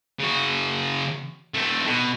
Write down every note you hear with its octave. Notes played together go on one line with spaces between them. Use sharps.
C#3 F#4
A3 C4
B2